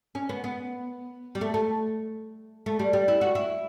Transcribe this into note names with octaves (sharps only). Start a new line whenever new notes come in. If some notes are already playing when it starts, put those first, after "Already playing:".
C#4
B3
B3
G3
A3
A3
A3
G3
G3
E4
F#4
E4